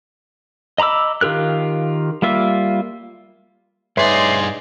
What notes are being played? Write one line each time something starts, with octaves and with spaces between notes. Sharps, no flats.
D#5 A#5 B5 D6 E6
D#3 F4 G4 A#4 F#6
G3 A#3 F4 E5
G2 D#4 G#4 B4 C#5 D5 E5 C6